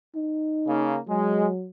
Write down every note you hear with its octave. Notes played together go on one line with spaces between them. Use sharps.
D#4
C#3 A#3
F#3 G#3